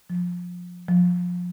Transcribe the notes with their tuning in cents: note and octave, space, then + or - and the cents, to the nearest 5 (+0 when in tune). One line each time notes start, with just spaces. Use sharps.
F3 +25
F3 +30